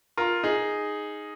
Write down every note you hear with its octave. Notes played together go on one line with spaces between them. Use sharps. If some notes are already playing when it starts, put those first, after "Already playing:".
F4 A#4
D#4 G#4